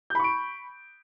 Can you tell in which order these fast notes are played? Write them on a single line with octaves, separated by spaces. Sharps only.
G6 B5 C#6 D7